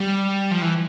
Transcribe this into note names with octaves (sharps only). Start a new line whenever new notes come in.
G3
F3
E3